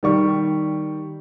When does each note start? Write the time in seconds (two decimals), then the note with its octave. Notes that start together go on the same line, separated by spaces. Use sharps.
0.03 D#3 G3 C#6